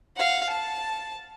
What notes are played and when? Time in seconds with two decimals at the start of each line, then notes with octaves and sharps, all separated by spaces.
0.16 F5 F#5
0.49 A5